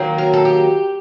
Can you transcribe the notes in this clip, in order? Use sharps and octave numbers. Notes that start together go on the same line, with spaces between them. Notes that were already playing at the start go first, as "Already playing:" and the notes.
Already playing: D#3 F#3 A#3
A#4
A4
G4